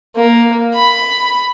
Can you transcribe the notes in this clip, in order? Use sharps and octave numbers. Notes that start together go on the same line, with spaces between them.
A#3
B5